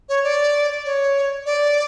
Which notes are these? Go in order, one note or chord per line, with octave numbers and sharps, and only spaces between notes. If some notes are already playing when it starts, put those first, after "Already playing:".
C#5
D5
C#5
D5